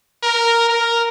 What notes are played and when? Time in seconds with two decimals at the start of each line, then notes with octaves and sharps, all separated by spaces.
0.23 A#4
0.69 A#4